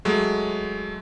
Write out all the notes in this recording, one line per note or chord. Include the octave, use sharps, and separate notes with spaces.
F#3 G#3 A3